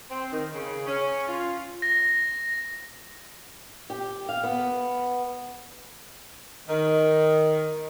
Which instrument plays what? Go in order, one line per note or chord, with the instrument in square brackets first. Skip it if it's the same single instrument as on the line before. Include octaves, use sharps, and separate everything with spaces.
[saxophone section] C4
D#3
C#3
C#4
F4
[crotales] A#6
[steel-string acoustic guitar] G4
F5
B3
[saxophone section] D#3